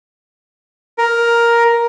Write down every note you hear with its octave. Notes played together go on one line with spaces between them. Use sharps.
A#4